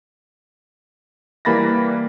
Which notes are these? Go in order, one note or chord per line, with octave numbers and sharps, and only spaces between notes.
E3 G3 A#3 B5 A6 A#6